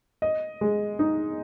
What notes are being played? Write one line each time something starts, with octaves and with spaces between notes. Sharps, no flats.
D#5
G#3
D#4